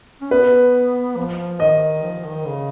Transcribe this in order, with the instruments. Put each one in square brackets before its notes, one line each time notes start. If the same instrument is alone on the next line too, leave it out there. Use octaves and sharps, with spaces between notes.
[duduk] C#4
[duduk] B3 [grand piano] B4
[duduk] F3
[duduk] D#3 [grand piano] D#5
[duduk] F3
D#3
C#3